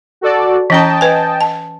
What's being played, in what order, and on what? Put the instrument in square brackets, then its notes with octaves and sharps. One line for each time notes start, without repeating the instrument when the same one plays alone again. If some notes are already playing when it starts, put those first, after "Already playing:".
[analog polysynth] F#4 A4 D5
[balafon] E3 C#4 A#5 [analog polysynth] D#5 G5 A5
[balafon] B4 G#5
A5